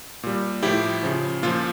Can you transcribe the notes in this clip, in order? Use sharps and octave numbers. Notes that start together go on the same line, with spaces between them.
A#2 G3
A2 F3 E4 G4
C#3 F3
A#2 F3 F4